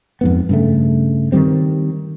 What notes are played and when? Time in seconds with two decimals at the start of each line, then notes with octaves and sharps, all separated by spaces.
0.21 F2 G#2 B3
0.49 G2 C#3 A3
1.32 D#3 E3 G3 C4